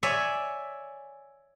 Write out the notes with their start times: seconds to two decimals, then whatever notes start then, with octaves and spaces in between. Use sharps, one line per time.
0.03 C#5 D5 E5 G#5